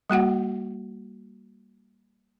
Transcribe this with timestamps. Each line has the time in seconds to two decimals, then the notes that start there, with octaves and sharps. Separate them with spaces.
0.10 G3 A#3 F#4 F#5